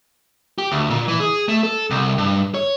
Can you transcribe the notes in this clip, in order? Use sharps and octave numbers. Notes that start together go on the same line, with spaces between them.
G4
D2
A#2
E3
G#4
A3
A4
C2
G2
C#5